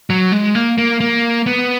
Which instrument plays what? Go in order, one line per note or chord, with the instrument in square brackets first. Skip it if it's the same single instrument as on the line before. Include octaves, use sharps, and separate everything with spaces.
[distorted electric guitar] F#3
G#3
A#3
A#3
A#3
B3